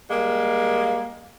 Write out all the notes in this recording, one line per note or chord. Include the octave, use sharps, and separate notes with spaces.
G3 G#3 A#3